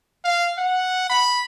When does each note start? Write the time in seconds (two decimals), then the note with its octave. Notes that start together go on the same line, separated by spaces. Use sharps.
0.24 F5
0.58 F#5
1.10 B5